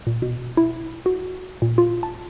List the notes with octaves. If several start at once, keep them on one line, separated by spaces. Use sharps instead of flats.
A#2
B2
E4
F#4
A#2
F4
A5